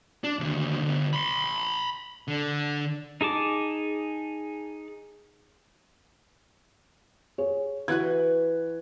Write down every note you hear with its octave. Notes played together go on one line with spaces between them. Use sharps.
D4
D#2 D3
D3 B3
B5 C6
D3
D#4 G#4 A5 D6
G#4 C#5
E3 F#4 B4 F#6 G#6